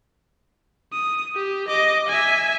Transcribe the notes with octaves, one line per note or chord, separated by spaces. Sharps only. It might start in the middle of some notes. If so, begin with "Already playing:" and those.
D#6
G4
D#5 D6
E5 G#5